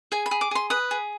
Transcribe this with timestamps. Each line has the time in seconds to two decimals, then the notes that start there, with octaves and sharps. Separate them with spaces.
0.12 G#4 G#5
0.26 B5
0.31 G#4
0.41 D6
0.51 G#4 C6
0.70 B4 D#6
0.91 G#4